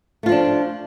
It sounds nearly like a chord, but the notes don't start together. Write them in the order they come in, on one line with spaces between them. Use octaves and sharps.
A3 F4 F3 D4